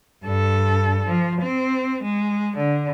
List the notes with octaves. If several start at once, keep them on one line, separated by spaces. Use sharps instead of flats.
G2 A4
F3
C4
G#3
D3